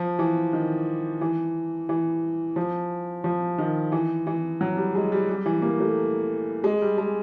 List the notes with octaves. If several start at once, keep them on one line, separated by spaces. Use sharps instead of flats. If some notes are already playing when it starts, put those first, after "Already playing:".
Already playing: F3
E3
D#3
E3
E3
F3
F3
D#3
E3
E3
F#3
G3
G#3
G3
G3
E3
A#3
A3
G#3
G3
G#3